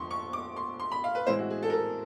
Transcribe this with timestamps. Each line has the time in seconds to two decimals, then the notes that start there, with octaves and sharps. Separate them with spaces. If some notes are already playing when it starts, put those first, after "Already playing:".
Already playing: F2 D3 F3 C6 C#6
0.11 C#6
0.33 D6
0.56 C6
0.80 C6
0.92 B5
1.04 F5
1.15 B4
1.27 A2 E3 G#3 C4 E4 C5
1.39 F#4
1.50 G#4
1.63 A4
1.70 A#4
1.73 A4